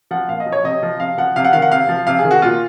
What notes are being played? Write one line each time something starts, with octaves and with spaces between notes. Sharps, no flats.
F3 F#5
A#2 F5
D#5
F3
C#5
C3 D#5
F3
C3 F5
F3 F#5
C3 F5
F#5
D#3 F5
F#5
C3 F5
F3
C3 F5
G#4
D#3
F#4
A#2 F4